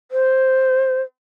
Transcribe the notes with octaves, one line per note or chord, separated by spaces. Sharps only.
C5